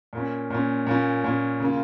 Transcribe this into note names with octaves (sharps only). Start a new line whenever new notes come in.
A#2 A#3 C#4
A#2 A#3 C#4
A#2 A#3 C#4
A#2 A#3 C#4
C#3 A#3 F4